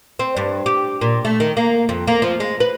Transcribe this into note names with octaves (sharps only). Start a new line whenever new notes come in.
C4
G2
G4
A#2
A3
D#3
A#3
F2
A#3
F3
G#3
B4